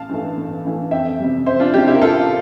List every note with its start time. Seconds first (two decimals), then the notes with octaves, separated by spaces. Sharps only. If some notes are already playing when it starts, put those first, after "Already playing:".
Already playing: A1 F5 A5
0.09 G2 E3 A3
0.37 A1
0.65 G2 E3 A3
0.91 F2 E5 G5
1.20 C3 G3
1.46 F2 C5 E5
1.60 D4 F4
1.73 C3 G3 E4 G4
1.87 E4 G4
1.95 A#4
2.01 A1 F4 A4